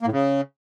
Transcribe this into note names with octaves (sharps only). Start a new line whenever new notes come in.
A#3
A2
C#3